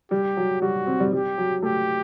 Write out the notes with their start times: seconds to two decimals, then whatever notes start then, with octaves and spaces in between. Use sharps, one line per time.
0.11 G3 G4
0.37 F#3
0.62 G3 F#4
0.87 C4
1.00 G3
1.12 G3 G4
1.38 F#3
1.62 A3 G4